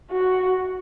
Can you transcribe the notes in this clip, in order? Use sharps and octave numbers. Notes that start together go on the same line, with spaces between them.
F#4